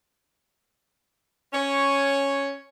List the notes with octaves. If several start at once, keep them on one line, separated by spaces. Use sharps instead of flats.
C#4 C#5